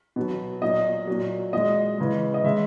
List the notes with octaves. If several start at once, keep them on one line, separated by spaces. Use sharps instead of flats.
B2 F#3
A#2 F#3 D#5
A#2 F#3
A#2 G#3 D#5
C#3 E3 G#3
D#5
C#3 G#3 E5